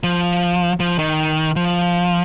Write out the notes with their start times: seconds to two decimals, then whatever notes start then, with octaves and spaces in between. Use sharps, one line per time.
0.03 F3
0.80 F3
0.99 D#3
1.56 F3